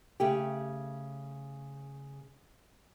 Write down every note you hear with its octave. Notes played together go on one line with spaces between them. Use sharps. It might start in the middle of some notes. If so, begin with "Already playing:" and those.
C#3 A3 G4